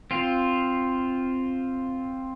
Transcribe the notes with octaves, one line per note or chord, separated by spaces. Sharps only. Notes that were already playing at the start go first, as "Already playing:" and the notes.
C4 F4